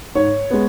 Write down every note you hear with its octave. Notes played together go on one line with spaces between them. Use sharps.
G#2 C#5
G#3 B3